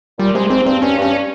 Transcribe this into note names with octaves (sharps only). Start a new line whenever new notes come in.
A#2 G3
C3 G#3
G#2 C4
G2 C4
G2 C#4
G2 C#4